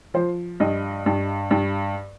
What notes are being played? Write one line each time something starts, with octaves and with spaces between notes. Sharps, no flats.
F3 C5
G2 D#5
G2
G2